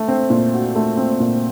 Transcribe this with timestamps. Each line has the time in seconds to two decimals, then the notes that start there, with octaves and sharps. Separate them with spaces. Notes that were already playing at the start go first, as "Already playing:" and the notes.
Already playing: A3
0.08 C4
0.30 A#2
0.54 F#4
0.75 A3
0.97 C4
1.20 A#2